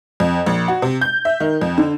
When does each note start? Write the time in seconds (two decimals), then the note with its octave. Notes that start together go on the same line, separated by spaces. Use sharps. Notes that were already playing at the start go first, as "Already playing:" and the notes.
0.20 F2
0.46 A#1
0.68 F#4
0.82 C3
1.01 G6
1.25 E5
1.40 D#3
1.61 F2
1.78 D3